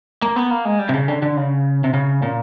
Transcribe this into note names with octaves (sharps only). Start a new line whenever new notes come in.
A#3
B3
A#3
G#3
G3
C3
C#3
D3
D3
C#3
C3
C#3
A#2